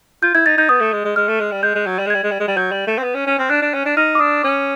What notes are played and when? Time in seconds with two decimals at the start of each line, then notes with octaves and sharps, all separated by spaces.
0.23 F4 G6
0.34 E4 G#6
0.46 D#4 A6
0.57 D#4 G6
0.69 B3 D#6
0.81 A3
0.93 G#3
1.05 G#3
1.16 G#3 F6
1.28 A3
1.40 G#3
1.52 G3
1.63 G#3 G6
1.75 G#3
1.86 F#3
1.99 G3
2.06 G#3
2.10 G3 G#6
2.23 G#3
2.31 G3
2.40 G#3
2.48 G3
2.57 F#3 G6
2.72 G3
2.87 A3
2.98 C4
3.03 B3
3.14 C#4
3.27 C#4
3.39 C4 F6
3.50 D4 F#6
3.61 D4
3.74 C#4
3.86 D4
3.96 D#4 F6
4.15 D6
4.19 D4 D#6
4.43 C#4 D6